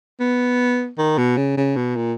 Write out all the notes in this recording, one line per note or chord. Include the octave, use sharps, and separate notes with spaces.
B3
D#3
B2
C#3
C#3
B2
A#2